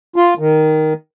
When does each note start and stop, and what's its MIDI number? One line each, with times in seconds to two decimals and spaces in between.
0.16 0.34 65
0.39 0.93 51